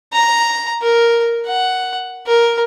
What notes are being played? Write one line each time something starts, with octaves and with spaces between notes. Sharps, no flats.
A#5
A#4
F#5
A#4